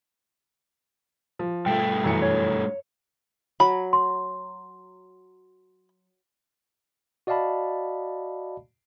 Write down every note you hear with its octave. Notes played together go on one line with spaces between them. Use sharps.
F3
G2 A3 G5
F#2 E3 C#7
C#5
F#3 B5
C6
F#4 D5 D#5 F5 A5 B5